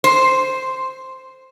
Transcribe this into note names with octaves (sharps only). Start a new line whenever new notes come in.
C5